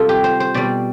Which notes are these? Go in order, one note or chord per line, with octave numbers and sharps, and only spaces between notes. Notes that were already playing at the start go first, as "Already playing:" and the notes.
Already playing: C3 G3 F4 A4
G4
C5
C5
B2 G3 D5